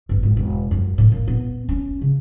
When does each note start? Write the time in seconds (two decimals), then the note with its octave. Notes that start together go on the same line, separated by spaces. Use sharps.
0.09 G1
0.23 G#1
0.37 E1
0.71 F#2
0.98 A2
1.12 A#2
1.28 B3
1.69 C#4
2.02 C#3